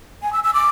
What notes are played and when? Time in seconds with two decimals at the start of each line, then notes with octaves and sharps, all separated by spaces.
0.23 G#5
0.33 E6
0.44 E6
0.54 D6